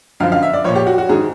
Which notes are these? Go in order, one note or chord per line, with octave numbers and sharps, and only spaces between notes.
F#2 D3 F3 F5
F5
E5
D5
A#2 F3 C#5
G4
F#4
F#4
G#2 D#3 G#4